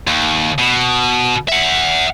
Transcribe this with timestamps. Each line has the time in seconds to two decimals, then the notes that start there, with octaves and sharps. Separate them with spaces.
0.08 D#2
0.59 B2
1.49 E5 F#5